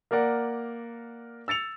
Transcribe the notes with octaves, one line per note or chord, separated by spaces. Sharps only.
A#3 A#4 D5 F#5
E6 A6 C#7 F7